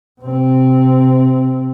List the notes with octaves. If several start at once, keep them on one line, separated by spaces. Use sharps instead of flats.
C3 C4